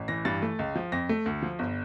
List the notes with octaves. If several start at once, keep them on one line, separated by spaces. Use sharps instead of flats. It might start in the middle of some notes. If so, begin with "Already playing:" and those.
Already playing: A1
E3 A#6
G2 A6
A3
C#2
F3
F2 A#6
A3
D2
F3
G1